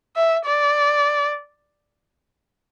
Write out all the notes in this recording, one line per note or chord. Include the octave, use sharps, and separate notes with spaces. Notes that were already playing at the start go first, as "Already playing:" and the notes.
E5
D5